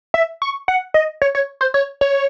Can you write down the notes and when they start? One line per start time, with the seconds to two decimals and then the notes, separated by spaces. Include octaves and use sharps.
0.14 E5
0.42 C#6
0.68 F#5
0.94 D#5
1.22 C#5
1.35 C#5
1.61 C5
1.74 C#5
2.01 C#5